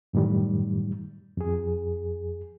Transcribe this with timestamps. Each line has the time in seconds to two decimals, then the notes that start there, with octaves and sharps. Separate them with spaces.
0.13 F#2 A2 D#3 G3
1.37 F2 G#4